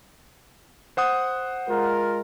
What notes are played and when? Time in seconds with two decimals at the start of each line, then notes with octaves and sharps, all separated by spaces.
0.97 C5 F#5 D#6
1.68 G#3 F4 A#4